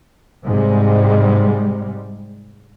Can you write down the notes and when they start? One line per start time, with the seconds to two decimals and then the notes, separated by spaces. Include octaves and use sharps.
0.47 G#2 C3 G3 G#3